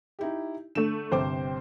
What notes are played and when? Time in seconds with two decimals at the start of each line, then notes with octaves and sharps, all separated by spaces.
0.19 D#4 E4 G4
0.75 D3 A3 E7
1.12 G1 C3 C5 G5 D6